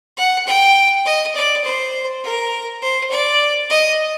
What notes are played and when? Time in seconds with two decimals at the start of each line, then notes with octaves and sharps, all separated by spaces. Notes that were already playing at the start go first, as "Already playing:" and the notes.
0.17 F#5
0.47 G5
1.05 D#5
1.35 D5
1.64 C5
2.23 A#4
2.82 C5
3.10 D5
3.70 D#5